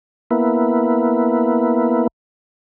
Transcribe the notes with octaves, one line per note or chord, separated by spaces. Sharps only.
A#3 B3 E4